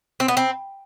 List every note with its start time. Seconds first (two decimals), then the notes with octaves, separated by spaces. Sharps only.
0.20 C4
0.28 B3
0.37 C4